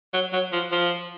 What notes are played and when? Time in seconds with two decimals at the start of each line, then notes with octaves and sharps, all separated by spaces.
0.14 F#3
0.33 F#3
0.53 F3
0.72 F3